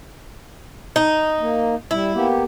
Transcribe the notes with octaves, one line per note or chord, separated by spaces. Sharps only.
D#4
A#3
G3 E4
A#3 B3 G4